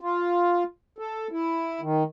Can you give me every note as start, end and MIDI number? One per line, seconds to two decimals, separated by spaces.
0.01 0.63 65
0.98 1.28 69
1.31 1.81 64
1.81 2.03 51